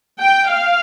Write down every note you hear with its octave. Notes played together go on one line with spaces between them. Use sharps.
G5
F5